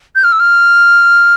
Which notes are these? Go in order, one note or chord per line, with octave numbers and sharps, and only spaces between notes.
G6
F6
E6
F6